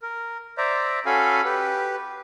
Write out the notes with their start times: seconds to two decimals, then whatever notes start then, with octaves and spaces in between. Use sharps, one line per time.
0.02 A#4
0.58 C5 D5 E5 A#5
1.06 C#4 F#4 A4 F5 G#5 B5
1.45 G4 B4